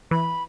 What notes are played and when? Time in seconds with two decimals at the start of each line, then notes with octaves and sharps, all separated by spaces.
0.11 E3 B5